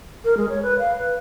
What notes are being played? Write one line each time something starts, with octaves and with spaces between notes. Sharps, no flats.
A#4
G#3
C#5
B4
F5
B4